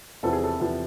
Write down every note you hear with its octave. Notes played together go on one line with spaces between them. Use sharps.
E2 C3 F3 A4
G#4
A4
E2 C3 F3